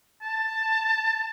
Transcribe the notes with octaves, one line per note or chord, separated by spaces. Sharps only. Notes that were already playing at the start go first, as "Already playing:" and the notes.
A5